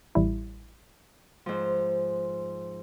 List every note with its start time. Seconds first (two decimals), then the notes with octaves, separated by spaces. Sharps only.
0.15 A1 G3 E4
1.46 G#2 F3